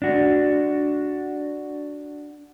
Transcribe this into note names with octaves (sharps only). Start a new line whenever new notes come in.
D4 F#4